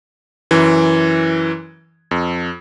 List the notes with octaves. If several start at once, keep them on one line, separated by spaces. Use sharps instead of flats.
F#2 E3
F2